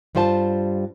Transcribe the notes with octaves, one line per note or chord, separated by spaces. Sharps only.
G2 G3 F4 C5 G#5 A5